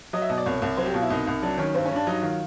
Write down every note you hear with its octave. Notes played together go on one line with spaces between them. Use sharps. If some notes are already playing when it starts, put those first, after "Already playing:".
F#3 D#5
E5
B2 D#5
D5
C2 C#5
C2
F#3 C5
G4
B2 F4
E4
C2 D#4
C2
F#3 D4
D#3 C#4
G2 C4
C#4
G2 D4
F#3 D#4
D#3 F4